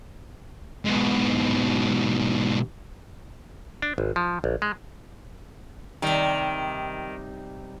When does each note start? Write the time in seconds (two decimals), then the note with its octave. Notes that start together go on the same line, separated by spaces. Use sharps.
0.85 G#2 B2
3.82 D4
3.98 G#1
4.16 F3
4.44 A#1
4.62 G#3
6.02 C3 D#3 G3